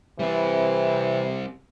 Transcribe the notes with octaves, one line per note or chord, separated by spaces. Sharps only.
C3 E3 G3 C4